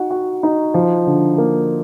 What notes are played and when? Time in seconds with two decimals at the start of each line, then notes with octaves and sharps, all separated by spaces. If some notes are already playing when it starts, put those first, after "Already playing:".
Already playing: D#4 F#4
0.11 F#4
0.43 D#4
0.74 F3
1.07 D3
1.38 A#3